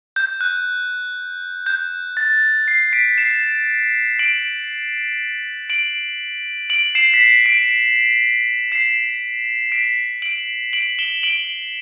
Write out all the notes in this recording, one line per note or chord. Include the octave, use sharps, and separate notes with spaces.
G6
F#6
G6
A6
C7
B6 D7
C7 E7
D7 F#7
D7 F#7
D7 F#7
C7 E7
B6
C7
B6 D7
C7 E7
B6 D7
D7 F#7
D7 F#7
E7 G7
D7 F#7